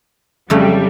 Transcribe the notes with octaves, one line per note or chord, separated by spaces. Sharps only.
F2 C#3 F#3 G3 A3